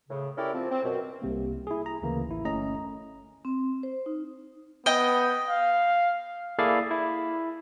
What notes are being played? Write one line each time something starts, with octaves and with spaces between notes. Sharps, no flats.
A2 C#3
C#4 E4 G4 A4 A#4 D5
F3 C4
C4
F#2 B2 C4
C2 C3 A#3
E4 G#4
A#5
D2 C#3 E3 A#3
A1 E4
G1 A3 C#4 D#5 A#5
C4
C5
D#4
B3 D#5 G5
F5
A#3 E4 G#4 A4 D5 F5
E4